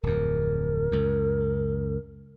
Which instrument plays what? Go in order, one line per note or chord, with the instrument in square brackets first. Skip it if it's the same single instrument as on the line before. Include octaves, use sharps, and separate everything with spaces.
[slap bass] D1 F2 [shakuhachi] A#4
[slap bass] C#2 F#2